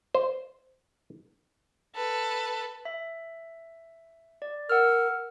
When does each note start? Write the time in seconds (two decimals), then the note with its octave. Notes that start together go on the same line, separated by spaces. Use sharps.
0.15 C5
1.96 A4 B4
2.85 E5
4.42 D5
4.70 A#4 F#5 E6 F6